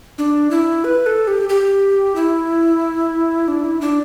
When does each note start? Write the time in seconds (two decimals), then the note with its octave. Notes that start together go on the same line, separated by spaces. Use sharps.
0.18 D4
0.51 E4
0.84 B4
1.06 A4
1.28 G4
1.49 G4
2.16 E4
3.48 D4
3.64 E4
3.81 D4